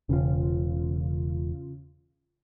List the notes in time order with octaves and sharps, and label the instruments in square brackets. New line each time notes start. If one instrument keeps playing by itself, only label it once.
[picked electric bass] E1 [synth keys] C#3 F4